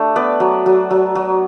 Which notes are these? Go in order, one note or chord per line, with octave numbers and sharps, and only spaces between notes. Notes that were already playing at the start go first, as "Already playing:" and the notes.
Already playing: A3 D4 G4
B3 B4 D5
F#3
F#3
F#3
F#3